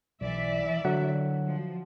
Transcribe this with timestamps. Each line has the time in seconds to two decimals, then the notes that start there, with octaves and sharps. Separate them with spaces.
0.21 B1 E3 D5 E5
0.85 D3 F#3 F#5
1.46 F3